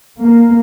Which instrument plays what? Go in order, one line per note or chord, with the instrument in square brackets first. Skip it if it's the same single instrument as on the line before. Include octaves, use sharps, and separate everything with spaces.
[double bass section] A#3